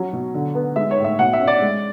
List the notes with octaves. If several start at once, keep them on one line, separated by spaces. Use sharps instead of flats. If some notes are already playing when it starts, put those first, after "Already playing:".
Already playing: F#3 C#4
B2
D3
B3
G#3 E5
C#5
A2
E5
B2 F#5
E5
C#4
D5
G#3